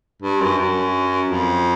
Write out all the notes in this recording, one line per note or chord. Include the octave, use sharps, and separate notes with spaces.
G2
F#2
F#2
F2